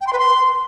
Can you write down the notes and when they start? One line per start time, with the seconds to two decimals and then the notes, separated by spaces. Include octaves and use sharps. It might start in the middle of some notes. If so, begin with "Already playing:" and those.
0.01 G5
0.07 C6
0.13 B4
0.19 C6